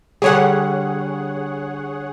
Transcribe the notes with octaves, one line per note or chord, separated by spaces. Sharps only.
D3 G3 G#4 C#5 F#5